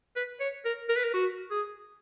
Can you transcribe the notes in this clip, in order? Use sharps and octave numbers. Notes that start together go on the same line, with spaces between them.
B4
C#5
A#4
A#4
B4
A#4
F#4
G#4